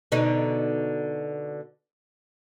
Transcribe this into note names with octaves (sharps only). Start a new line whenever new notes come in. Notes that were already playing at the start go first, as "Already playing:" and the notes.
B2 D3 D#4